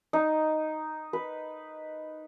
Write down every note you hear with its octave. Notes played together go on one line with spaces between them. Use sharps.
D#4
B4